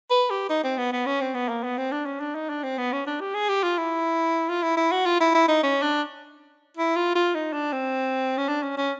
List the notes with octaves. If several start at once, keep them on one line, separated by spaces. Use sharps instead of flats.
B4
G4
D#4
C4
B3
B3
C#4
C4
B3
A#3
B3
C4
D4
C#4
D4
D#4
D4
C4
B3
C#4
D4
G4
G#4
G4
F4
E4
F4
E4
E4
F#4
F4
E4
E4
D#4
C#4
D4
E4
F4
F4
D#4
D4
C4
C#4
D4
C#4
C#4